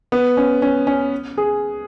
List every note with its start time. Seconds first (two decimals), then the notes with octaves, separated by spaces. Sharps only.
0.12 B3
0.37 C#4
0.62 C#4
0.87 C#4
1.37 G#4